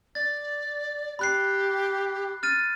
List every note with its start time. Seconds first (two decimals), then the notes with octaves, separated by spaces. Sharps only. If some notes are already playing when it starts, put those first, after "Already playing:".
0.15 D5 A6
1.19 G4 B5 F#6 C7
2.43 F6 A6 D#7